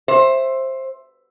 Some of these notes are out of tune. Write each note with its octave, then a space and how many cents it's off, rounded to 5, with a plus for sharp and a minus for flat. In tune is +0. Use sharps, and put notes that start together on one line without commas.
C5 +15 E5 +5